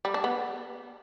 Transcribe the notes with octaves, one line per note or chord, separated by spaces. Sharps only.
G3
D4
B3